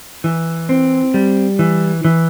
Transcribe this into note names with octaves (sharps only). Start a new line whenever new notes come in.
E3
C4
G3
E3
E3